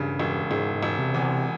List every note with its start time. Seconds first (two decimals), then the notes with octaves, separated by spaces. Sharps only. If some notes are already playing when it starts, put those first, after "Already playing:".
Already playing: E1 G2 C#3
0.19 E1
0.50 E1 G#2
0.75 G#2
0.82 E1
0.99 C3
1.14 E2
1.22 C3